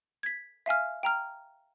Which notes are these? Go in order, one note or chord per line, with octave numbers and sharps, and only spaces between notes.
G#6 B6
E5 F5 G#5 F6
G5 A#5 F6